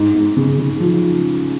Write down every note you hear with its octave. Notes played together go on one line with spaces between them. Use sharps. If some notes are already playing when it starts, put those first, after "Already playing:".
Already playing: G#2
G#2
C#3
C#3
F3